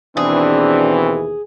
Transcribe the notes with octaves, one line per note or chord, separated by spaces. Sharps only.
D#2 B2 E3 C4 D4 G#4